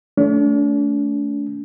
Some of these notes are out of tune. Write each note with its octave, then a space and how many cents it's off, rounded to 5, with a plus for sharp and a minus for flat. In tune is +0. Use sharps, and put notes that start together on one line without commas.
A3 -15 D4 -45